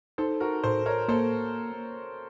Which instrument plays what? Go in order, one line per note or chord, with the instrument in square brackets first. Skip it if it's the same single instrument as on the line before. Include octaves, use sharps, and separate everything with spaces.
[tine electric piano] D#4 [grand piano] A4 C5
[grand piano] F#4 A#4
[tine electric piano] A2 [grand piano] A4 C5
[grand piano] A#4 C#5
[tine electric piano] A#3 [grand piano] A4 C5